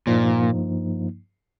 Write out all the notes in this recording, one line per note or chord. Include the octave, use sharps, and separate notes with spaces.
G2 A#2 F3 A#3 D#4